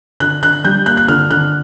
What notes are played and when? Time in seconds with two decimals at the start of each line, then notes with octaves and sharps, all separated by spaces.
0.20 D3 F#6
0.42 D3 F#6
0.65 G3 G6
0.86 A#3 F#6
0.97 F#6
1.08 D3 F6
1.30 D3 F#6